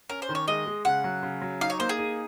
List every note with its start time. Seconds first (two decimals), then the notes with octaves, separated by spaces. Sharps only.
0.09 C#4 A#4
0.22 C5
0.29 D#3
0.35 C#5
0.48 G#3 D#5
0.66 G#3
0.85 C#3 F#5
1.04 F#3
1.23 C#3
1.42 F#3
1.61 D#4 F5
1.70 C#5
1.79 A#3 C5
1.89 G#4
1.99 D#4